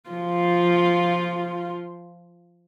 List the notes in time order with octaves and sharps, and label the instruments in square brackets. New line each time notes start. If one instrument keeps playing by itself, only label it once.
[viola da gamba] F3 [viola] F4